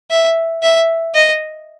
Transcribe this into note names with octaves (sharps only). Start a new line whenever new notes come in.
E5
E5
D#5